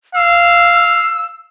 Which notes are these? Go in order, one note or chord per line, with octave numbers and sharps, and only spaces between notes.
F5 E6